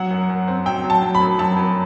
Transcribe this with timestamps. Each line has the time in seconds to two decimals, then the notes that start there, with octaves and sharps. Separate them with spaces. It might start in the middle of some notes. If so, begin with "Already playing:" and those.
Already playing: F#3 F#5
0.11 F#2
0.29 F#2
0.48 C4
0.66 F#3 G5
0.84 F#3
0.90 A5
1.02 F#3
1.15 B5
1.20 F#2
1.39 F#3 A5
1.57 F#2